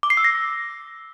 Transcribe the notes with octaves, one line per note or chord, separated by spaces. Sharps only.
D6
C7
E6
A#6